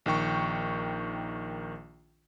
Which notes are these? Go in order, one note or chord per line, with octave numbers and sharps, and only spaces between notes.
A#1 D#3 G5 C#6